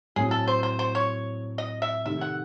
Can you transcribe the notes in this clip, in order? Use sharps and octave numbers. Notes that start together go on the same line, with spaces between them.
A2 F#3 C4 G#4
A4
C5
C5
C5
C#5
D#5
E5
C3 D#3 A3 E5
F#5